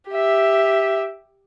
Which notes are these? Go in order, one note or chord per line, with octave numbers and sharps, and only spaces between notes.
G4 E5